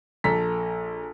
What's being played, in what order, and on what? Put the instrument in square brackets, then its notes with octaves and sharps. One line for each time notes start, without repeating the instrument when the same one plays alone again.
[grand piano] A#1 A4 A#5 B6